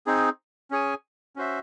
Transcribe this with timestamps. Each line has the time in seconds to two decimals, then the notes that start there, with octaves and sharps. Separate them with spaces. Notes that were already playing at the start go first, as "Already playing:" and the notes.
0.06 C4 D#4 G#4
0.71 C#4 G#4 C#5 G#5
1.36 C#4 F#4 C5 E5